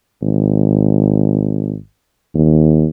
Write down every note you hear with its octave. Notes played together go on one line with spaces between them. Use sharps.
G#1
D#2